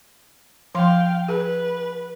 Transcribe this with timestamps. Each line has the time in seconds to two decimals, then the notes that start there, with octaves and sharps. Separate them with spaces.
0.75 F3 F5 G5 C6
1.28 G#4 B4